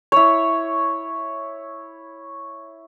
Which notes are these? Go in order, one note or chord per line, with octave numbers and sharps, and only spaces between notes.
E4 C#5